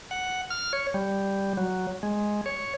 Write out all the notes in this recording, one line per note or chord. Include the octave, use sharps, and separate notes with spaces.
F#5
F6
C#5
G3
F#3
G#3
C#5